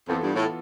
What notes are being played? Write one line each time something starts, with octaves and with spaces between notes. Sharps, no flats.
F2 E3 B3 F4 A4
G2
A2